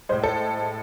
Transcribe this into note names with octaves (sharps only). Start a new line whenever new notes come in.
A2 G#3 C5
A4